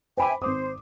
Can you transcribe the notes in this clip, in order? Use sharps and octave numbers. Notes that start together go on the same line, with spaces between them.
C5 E5 G5 G#5 B5 D6
G#1 C5 D6 D#6